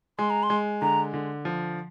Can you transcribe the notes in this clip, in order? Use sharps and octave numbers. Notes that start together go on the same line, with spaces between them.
G#3 C6
A#5
C6
G#3
D3 A#5
D3
F3